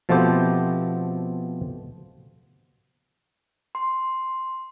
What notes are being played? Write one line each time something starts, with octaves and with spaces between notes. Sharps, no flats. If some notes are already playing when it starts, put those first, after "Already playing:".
B2 F3 A3 B3 C4 G4
C6